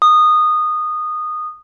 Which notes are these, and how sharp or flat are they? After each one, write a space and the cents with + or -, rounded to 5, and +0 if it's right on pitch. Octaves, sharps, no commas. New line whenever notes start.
D#6 -15